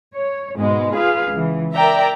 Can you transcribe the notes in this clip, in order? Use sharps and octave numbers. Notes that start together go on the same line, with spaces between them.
C#5
G#2 B2 G#3 B3
F4 G#4 B4 F5
C#2 E3
A#4 D5 E5 G5 A#5